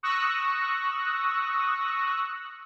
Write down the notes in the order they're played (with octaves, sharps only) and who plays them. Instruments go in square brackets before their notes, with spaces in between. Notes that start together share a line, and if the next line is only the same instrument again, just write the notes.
[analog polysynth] C#6 D#6 E6 F#6 A#6